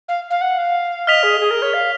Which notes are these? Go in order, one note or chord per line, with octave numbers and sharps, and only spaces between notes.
F5
F5
F#5
F5
D#5 F6 B6 F7
G#4
G#4
A#4
C#5
F5